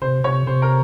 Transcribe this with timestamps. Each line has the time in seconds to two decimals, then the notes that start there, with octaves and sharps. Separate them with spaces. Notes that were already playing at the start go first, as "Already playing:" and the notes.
0.02 C3 C5
0.24 C3 C#5
0.47 C3 C5
0.62 A#4